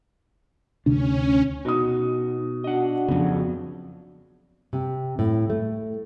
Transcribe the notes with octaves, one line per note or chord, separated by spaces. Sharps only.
D2 C3 C#4 D4
B2 B3 D#4 D#6
D4 F#4 D#5 F#5
F2 C#3 F3 F#3 B3
C3
A2
A3